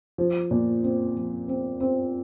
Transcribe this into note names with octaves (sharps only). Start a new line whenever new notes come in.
F3
A#2
C4
F3
C4
C4